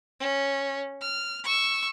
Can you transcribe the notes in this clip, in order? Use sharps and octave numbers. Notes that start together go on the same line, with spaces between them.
C#4
F6
C#6 E6